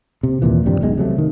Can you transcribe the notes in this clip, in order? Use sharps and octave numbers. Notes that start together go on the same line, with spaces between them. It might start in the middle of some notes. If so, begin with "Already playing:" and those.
C3
D#2 A#2 E3
G2 C3 F3 G3
E1 B1 B2 G#3
C3 F#3 A3
D#3